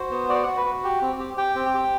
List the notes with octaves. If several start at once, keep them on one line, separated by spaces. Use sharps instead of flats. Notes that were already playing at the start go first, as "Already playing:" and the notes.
Already playing: F#4 C5
B3
F#4 D5
F#4 F#5
B4
F#4
G4
C4
G4
G4 G5
C4
G4